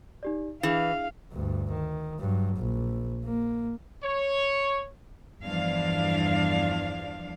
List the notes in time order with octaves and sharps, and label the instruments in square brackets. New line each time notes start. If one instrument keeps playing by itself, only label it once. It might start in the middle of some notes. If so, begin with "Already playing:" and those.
[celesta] D#4 G4 D5
[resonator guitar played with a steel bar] E3 [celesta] D4 G#4 F#7 [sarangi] F5
[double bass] D2 G2
D#3
G2 F#3
A#1
A#3
[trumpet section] C#5
[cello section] E2 G2 E3 F3 D4 F5